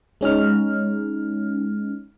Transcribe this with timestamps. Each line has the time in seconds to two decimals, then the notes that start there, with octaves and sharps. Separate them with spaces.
0.21 G#3 C#4 D#4 F6